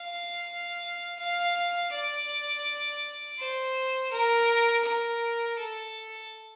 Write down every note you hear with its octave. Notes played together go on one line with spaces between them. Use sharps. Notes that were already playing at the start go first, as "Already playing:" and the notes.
Already playing: F5
F5
D5
C5
A#4
A#4
A4